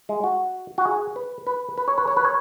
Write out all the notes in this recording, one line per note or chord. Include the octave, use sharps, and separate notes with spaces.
G#3
F#4
F#4
G#4
B4
B4
B4
C#5
B4
C#5
B4
C#5